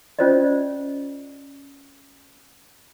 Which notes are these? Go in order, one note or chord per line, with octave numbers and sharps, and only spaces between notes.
C#4 F4 C5 D5 D#5